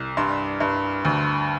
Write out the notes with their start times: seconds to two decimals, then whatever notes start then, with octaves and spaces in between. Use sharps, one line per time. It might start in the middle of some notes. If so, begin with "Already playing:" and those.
Already playing: C2
0.17 G2 C6
0.60 G2
1.05 D2